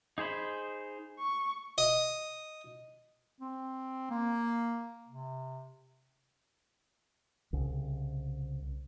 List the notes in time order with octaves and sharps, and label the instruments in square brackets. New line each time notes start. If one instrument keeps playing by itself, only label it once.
[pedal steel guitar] D#4 G#4 C5 B5
[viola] C#6
[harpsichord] D#5
[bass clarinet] C4
A#3
C3
[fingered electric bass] C2 C#3